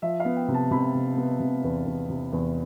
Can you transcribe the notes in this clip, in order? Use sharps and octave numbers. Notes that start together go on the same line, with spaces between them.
F3 E5
B3 F5
G5
C3
A5
C3 B5
C3
B3
C3
E2
E2
C3
E2